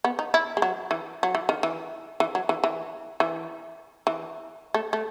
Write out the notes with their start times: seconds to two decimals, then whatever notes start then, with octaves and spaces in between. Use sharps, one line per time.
0.04 B3
0.19 D#4
0.34 E4
0.57 G#3
0.62 F#3
0.91 E3
1.23 F#3
1.35 E3
1.49 D#3
1.63 E3
2.20 E3
2.35 F#3
2.49 E3
2.64 E3
3.20 E3
4.07 E3
4.74 A3
4.93 A3